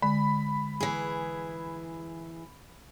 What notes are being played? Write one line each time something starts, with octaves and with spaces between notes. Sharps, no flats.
D3 G#3 B5
E3 G#4